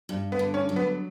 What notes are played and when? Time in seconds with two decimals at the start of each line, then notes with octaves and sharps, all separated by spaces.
0.09 G2
0.32 B3
0.39 D3
0.54 C#4
0.69 F#3
0.76 B3